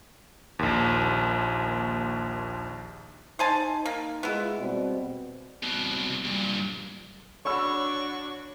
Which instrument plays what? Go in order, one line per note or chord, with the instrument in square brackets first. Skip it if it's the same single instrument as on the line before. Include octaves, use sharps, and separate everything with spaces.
[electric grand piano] A#1 D#2
[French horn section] D#4 [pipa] C5 G#5 A5
[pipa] A#3
[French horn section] G#3 F4 [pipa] B3 E4
[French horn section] B2 G3 C4
[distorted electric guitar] C2 B2
G2 A#2
[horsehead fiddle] D4 F#4 [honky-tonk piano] C#5 B5 E6 [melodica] C#6